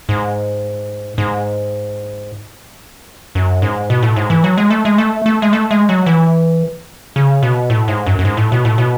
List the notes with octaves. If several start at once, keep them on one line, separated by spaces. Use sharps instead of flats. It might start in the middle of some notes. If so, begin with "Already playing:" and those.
G#2
G#2
F#2
G#2
B2
A2
G#2
E3
F#3
G#3
A3
G#3
A3
A3
G#3
A3
G#3
F#3
E3
C#3
B2
A2
G#2
F#2
F#2
G#2
A2
B2
A2
B2